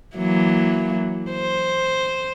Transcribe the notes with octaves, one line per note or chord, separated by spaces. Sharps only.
E3 F#3 A#3
C5